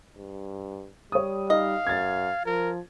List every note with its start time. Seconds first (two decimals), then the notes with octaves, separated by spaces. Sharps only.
0.17 G2
1.12 G3 C#5 D#6
1.50 D#4 D#5 F5
1.87 F#2 G#6 A6
2.46 F3 A#4